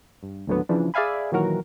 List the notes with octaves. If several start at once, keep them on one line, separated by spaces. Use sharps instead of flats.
G2
D#2 A2 D3 F#3 B3
C#3 E3 F3 D4
G#4 D5 E5 F5 G#5 B5
A#2 D#3 E3 F#3 F#4 A#4